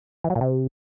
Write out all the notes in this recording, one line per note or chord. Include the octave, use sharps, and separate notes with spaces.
E3
F#3
A#2
C3